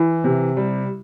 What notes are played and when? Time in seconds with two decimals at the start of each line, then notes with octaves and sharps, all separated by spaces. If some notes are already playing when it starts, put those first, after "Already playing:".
Already playing: E3 E4
0.24 C3
0.57 G3